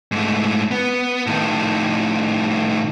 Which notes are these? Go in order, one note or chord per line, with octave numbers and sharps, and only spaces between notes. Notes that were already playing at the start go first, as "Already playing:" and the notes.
G#2 A3
B3
A2 D#3